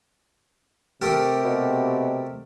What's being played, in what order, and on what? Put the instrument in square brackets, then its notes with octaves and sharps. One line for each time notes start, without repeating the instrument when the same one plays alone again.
[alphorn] C3 [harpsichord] A3 G4 A#4
[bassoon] B2